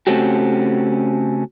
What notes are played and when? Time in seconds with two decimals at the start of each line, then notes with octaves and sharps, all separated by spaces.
0.07 C#3 A3 C4 C#4 F#4 G4